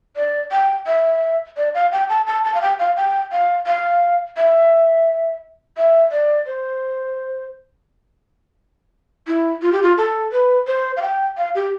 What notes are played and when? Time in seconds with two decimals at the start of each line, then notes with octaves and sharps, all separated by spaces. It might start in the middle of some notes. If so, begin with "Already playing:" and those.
0.16 D5
0.52 G5
0.86 E5
1.57 D5
1.74 F5
1.92 G5
2.09 A5
2.27 A5
2.44 A5
2.54 F5
2.62 G5
2.79 F5
2.97 G5
3.32 F5
3.67 F5
4.37 E5
5.77 E5
6.12 D5
6.46 C5
9.27 E4
9.62 F4
9.72 G4
9.82 F4
9.97 A4
10.32 B4
10.67 C5
10.97 F5
11.02 G5
11.37 F5
11.55 G4